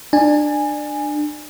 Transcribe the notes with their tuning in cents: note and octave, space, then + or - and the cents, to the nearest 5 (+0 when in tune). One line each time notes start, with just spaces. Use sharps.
D4 +25 G#5 -5